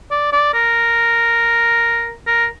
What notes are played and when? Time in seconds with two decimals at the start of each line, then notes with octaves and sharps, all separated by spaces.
0.11 D5
0.32 D5
0.53 A#4
2.26 A#4